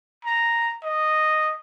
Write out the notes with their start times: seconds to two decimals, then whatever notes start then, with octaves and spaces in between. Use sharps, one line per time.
0.25 A#5
0.83 D#5